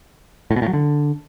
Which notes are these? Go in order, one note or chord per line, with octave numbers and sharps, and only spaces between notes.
A2
B2
A2
F#3
D3